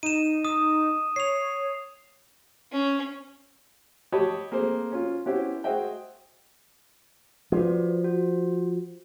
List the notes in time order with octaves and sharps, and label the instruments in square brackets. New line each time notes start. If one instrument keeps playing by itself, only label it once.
[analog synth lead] D#4 [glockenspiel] D#7 E7
[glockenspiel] D#6
[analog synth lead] C#5 [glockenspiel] C7 F7
[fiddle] C#4
[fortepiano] G4 C#5 D#5 A5 B5 D#6
A#3 C4 G#4 A4 C5
C#4 F4
B3 C#4 E4 G4 C5
F#4 G#4 C5 D#5 E5 G5
[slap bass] F3 [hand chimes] F#4 B4 D5
[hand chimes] F#4